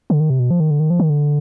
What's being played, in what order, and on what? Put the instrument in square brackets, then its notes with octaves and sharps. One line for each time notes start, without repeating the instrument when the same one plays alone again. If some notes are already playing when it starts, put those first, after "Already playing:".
[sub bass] D3
D#3
C3
B2
F3
D#3
D3
D#3
F3
D#3
D3